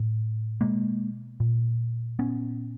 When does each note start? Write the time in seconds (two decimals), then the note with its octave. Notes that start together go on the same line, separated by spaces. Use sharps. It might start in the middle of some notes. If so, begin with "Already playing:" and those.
Already playing: A2
0.61 B2 G#3 A#3
1.40 A#2
2.19 A#2 B3 C#4